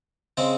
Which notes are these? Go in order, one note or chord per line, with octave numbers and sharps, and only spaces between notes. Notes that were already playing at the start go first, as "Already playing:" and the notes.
C#3 G#3 C4 G5